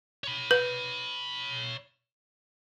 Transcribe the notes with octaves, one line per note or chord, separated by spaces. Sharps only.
C#5 B5
B4